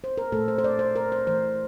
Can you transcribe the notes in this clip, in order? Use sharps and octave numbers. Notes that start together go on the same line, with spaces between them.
C5
A#4
A#2 A3 A4
C5
C5
D5
C5
A#4
C5
E3 A3 C5